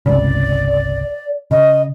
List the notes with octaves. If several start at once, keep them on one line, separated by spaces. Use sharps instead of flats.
G1 C2 C#3 D5
C#3 D#5